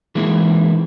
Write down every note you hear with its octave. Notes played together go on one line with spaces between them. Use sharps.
E3 G#3 A#3 C4 D#4 E4